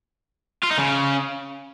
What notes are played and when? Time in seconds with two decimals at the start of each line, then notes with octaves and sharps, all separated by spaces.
0.64 F4
0.71 D#4
0.78 C#3